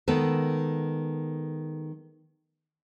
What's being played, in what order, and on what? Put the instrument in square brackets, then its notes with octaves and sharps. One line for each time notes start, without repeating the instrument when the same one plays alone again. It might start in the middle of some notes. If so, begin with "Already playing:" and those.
[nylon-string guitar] D#3 G#3 B3 A4